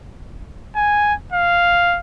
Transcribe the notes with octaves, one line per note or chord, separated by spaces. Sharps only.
G#5
F5